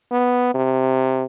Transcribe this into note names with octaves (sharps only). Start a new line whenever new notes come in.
B3
C3